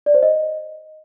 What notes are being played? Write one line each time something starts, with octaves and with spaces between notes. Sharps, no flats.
D5
C5
D#5